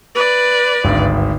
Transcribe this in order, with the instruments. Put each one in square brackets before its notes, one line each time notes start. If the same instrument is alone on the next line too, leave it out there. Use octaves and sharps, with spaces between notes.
[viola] B4 D5
[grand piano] G#1 D2 G2